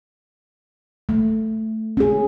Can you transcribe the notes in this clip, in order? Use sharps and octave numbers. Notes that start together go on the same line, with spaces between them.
A3
C#4 G#4